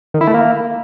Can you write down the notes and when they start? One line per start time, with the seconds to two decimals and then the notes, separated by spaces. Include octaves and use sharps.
0.14 D#3
0.21 E4
0.28 A3
0.34 A#3